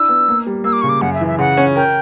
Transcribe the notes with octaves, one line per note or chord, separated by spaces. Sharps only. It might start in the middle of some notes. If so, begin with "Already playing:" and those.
Already playing: D4 E4 E6
B3
A#3
G3
A#3 E6
D6
C#3 C#6
D6
F#2 F#5
E5
E3
E5
C#3 F#5
C#4
A#4 G5